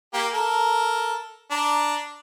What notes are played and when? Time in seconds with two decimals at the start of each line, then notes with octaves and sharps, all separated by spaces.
0.13 A#3 G4
0.34 A4 A#4
1.51 D4 A#5